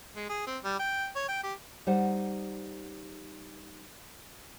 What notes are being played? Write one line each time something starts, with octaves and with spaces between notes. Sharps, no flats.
G#3
G#4
C4
G3
G5
C#5
G5
G4
G3 D#4 C5 F#5